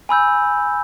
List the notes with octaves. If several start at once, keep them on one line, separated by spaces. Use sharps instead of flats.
G#5 B5 E6 G6